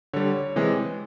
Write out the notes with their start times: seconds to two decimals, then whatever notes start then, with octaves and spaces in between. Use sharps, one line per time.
0.13 D3 G3 C#5
0.56 C3 E3 G#3